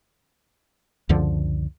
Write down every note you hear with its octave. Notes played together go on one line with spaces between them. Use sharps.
C#2 F#2 D3 F3